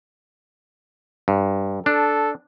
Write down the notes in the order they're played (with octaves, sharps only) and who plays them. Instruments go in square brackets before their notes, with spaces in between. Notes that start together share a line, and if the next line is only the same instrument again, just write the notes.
[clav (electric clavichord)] G2
[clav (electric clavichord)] D4 [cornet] A4